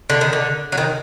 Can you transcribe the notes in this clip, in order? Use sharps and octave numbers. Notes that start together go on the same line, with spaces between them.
D3
D#3
D3
F#3
D#3